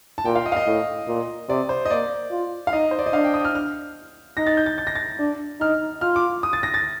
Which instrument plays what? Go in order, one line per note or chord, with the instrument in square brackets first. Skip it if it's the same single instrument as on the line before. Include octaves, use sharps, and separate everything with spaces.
[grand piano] A5
[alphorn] A#2 [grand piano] G5
[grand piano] F5
D#5
F5
D#5
[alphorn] A2
A#2
[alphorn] C3 [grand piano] D5
[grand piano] C5
D#5
[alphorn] A#3 [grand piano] D5
[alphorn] F4
[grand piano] F5
[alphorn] D#4 [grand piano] D#5
[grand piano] C5
D5
D#5
[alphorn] D4 [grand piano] F5
[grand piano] G5
D#6
F6
F6
[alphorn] D#4 [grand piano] A#6
[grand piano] A6
G6
A6
A6
A#6
A6
[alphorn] D4
[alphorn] D#4 [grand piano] F6
[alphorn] F4 [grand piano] F6
[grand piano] D6
D#6
A6
A#6
A6